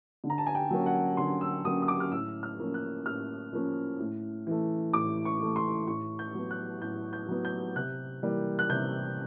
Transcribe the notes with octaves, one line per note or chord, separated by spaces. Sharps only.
D3
A#5
A5
G#5
G5
F#3 A#3 C#4
F#5
D3 C6
E6
F#3 A#3 C#4 D#6
D#6
D6
F6
A2 E6
F6
F3 A#3 C#4
F#6
A2 F6
F3 A#3 C#4
A2
E3 A3
A2 D6
C#6
E3 A3
C6
A2 C#6
G6
F#3 B3
F#6
A2 G6
G6
F#3 B3
G6
C3 F#6
E3 G3 A#3
F#6
C3 G6